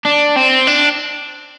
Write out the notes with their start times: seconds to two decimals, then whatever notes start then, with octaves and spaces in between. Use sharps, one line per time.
0.05 D4
0.36 C4
0.67 D4